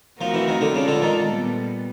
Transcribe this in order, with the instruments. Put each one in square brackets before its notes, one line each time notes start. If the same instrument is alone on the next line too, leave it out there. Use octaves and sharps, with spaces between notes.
[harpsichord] F3 [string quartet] A3 C4 D#4 F#4 A#4
[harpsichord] E3
D#3
D3
[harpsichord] C#3 [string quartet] G#3 C4 F4 A4 D5
[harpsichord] D3
D#3
[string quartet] A#2 G3 B3